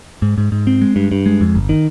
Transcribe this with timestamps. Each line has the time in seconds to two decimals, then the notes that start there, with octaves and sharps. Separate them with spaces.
0.22 G#2
0.38 G#2
0.52 G#2
0.67 C4
0.81 G#3
0.96 G2
1.12 G2
1.26 G#3
1.41 F2
1.55 G1
1.69 D#3